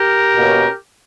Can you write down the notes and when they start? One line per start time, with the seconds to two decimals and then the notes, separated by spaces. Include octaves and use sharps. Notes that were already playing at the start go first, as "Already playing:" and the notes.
Already playing: G4 A#4
0.34 B2 A#3 C#4